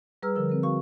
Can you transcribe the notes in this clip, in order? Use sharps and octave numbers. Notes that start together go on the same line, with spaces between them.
G3 G#4 B4 A#5 E6 F6
D3 F3 A#4 E6
C4 A#4
F#4 F5 C#6